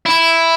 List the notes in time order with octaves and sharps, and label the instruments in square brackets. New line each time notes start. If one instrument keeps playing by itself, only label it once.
[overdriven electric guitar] E4